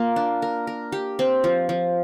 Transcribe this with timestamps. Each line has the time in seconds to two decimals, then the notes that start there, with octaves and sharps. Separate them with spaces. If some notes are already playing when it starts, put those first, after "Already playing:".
Already playing: A#3 F4
0.16 D4
0.42 A#4
0.67 A#4
0.92 G4
1.19 C4
1.44 F3
1.69 F3